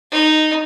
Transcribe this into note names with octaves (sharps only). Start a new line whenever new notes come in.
D#4